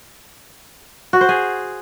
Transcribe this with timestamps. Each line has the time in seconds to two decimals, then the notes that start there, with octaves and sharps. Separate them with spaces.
1.13 F#4
1.21 C5
1.29 G#4